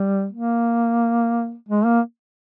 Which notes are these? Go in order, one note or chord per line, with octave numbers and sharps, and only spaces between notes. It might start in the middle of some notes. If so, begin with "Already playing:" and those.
Already playing: G3
A#3
G#3
A#3